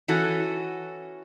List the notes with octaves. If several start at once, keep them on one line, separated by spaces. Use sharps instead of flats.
E3 C#4 F#4 A4